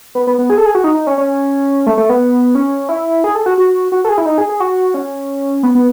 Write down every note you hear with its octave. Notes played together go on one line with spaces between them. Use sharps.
B3
B3
B3
G#4
A4
G#4
F#4
D#4
D#4
C#4
C#4
A3
A3
B3
C#4
E4
G#4
A4
F#4
F#4
F#4
A4
G#4
E4
D#4
G#4
G#4
F#4
C#4
B3
B3